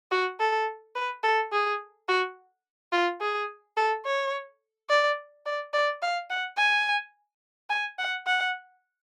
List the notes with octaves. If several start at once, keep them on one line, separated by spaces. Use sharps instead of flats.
F#4
A4
B4
A4
G#4
F#4
F4
G#4
A4
C#5
D5
D5
D5
F5
F#5
G#5
G#5
F#5
F#5